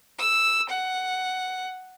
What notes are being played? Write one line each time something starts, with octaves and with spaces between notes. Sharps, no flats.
E6
F#5